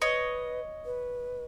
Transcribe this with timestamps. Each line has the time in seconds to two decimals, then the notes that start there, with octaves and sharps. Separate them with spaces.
0.01 B4 C#5 D#5
0.85 B4